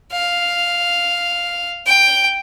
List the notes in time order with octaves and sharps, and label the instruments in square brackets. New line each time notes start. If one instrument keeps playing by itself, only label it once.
[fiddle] F5
G5